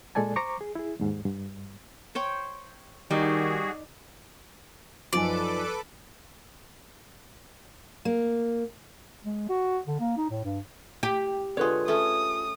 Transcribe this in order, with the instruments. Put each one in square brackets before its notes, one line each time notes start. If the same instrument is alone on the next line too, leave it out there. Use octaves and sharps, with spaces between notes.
[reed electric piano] A#2 G#3 A4 D5 G#5 A5
C5 A#5 C#6 D6
G#4
E4 G#4
D#2 G#2
G2
[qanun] C5 C#5 G5
[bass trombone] D#3 [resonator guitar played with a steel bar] G3 [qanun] D#4 [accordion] F#4 G#4
[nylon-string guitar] F#2 D#4 G#5 [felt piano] F3 [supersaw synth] A4 B4 D6 [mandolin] D5
[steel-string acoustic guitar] A#3
[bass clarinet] G#3
F#4
D3
A#3
D#4
A2
G2
[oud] G4
[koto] D3 G#3 [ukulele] F4 B4 C#5
[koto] A3 C#4 [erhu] D#6